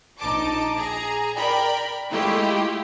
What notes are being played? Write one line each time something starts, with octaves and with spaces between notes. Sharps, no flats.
A#1 D#4 A5 D6
G#4 A#5
A#4 D5 G5 B5
G#3 A3 E4 F4 G4